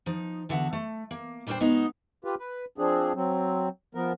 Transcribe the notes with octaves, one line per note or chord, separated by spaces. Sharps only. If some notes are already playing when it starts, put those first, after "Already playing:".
F3 D#4
E2 D3 F#4 E5 F#5
A3
A#3
A#2 G3 D4 A4 C5 G5
B2 G#3 B3 D#4 F#4
F4 G4 B4
B4
F3 C4 D4 G#4
F#3 C4
F3 B3 A#4